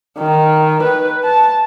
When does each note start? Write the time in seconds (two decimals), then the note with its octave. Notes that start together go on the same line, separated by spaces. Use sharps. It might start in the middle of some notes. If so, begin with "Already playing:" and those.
0.18 D#3
0.83 B4
1.24 A5